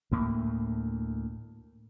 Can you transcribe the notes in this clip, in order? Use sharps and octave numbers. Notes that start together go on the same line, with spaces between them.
D2 A2 A#3